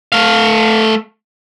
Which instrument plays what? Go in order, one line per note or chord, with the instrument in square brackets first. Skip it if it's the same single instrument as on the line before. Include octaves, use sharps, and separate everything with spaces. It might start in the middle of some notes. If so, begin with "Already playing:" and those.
[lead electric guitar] A3 F5